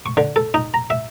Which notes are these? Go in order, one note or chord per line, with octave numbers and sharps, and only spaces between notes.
C#6
D3
A4
D#4
A#5
E5